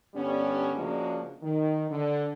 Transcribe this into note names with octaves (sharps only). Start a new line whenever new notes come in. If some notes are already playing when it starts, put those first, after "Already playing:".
G2 D3 G3 B3 C#4
C#3 F3 G#3 A#3 D4 F#4
D#3
D3